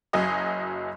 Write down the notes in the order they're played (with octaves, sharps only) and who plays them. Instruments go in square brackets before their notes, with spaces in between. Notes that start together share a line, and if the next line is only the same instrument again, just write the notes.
[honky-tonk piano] F#1 F#3 G#4 D#5 D#6